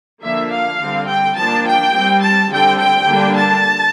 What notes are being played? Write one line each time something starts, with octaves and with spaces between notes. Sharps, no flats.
D3 F3 A#3 D4 E5
F5
D3 G3 C4
G5
F3 A#3 D4 A5
G5
G3 C4
A5
D3 G3 C4 G5
G5
D3 G3 A#3 D4
A5